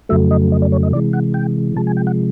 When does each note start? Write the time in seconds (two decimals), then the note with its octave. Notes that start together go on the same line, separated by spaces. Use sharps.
0.09 F2 C#3 F#3 A3 E5
0.31 D#5
0.52 D#5
0.62 D5
0.72 C#5
0.83 D#5
0.93 C3 E3 G#3 D5
1.13 F#5
1.34 G5
1.76 C3 F3 G#3 A5
1.87 G#5
1.97 G5
2.07 F#5